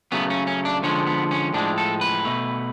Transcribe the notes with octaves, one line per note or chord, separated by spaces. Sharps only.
C#3 F#3 A3 B3
C#4
C#4
D4
D3 F3 G#3 C#4
B3
C#4
A2 F3 G#3 D4
A4
B4
B2 A3